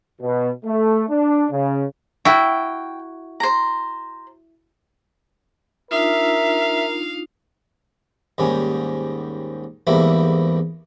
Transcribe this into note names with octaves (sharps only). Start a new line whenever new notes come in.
B2
A3
D4
C#3
E4 F#4 G5
C5 A#5
D4 D#4 F4 A#4 E5 F5
D#2 G#2 G3 C#4 G#5
E2 G#2 G3 A3 A#3 E4